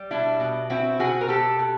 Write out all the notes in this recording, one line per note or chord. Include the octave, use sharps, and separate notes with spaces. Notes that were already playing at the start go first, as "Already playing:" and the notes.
Already playing: G3
B2 D4 E4
B2
C4 E4 F#4
B2 F#4 G#4
A#4
B2 G4 A4
B2